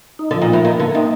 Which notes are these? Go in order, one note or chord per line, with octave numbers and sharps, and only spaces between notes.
D#4
D3
F3
A#2
A2 A#3
D#3 A#3
D3 A#3
C3 D#4